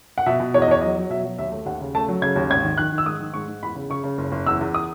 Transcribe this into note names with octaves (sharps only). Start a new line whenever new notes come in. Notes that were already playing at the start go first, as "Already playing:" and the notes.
F#5
B2 E5
B2
E2 C#5
D#5
E2 C#5
F#3 D#5
F#3
B2 E5
F#3
D#2 E5
A3
D#2 F#5
C#3
A3 A5
F#3
C#3 G#6
D#2
G#1 G#6
D#3
D#3 F#6
D#3
E6
G#2 D#6
D#3
G#2 C#6
G#2
E2 B5
C#3
C#3 C#6
C#3
F#1
F#1
E2 E6
E2
D#6